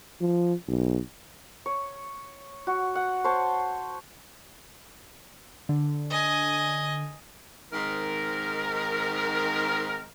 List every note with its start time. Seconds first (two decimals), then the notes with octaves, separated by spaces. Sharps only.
0.21 F3
0.68 B1
1.66 C#5
2.67 F#4
2.95 F#5
3.24 C5 C#5 A5
5.69 D3
6.10 D#5 G#5
7.73 G#2 D#3 C4 A#4